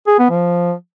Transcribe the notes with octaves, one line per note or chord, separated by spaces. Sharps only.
G#4
B3
F3